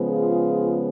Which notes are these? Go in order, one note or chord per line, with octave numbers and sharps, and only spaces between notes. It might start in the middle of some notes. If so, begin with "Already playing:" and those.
Already playing: C#3 F3 G#3 B3
F4 G#4